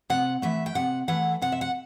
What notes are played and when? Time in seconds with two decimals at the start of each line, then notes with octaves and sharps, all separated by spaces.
0.10 C3 F#5
0.42 E3 A3 E5
0.66 G5
0.75 C3 F#5
1.08 E3 A3 F#5
1.42 C3 F#5
1.52 E5
1.61 F#5